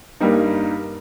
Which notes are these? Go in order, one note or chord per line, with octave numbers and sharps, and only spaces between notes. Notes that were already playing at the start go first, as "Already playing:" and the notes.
G2 G3 A#3 D#4